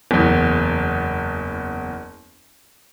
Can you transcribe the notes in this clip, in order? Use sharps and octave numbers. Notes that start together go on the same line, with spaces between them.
F#1 E2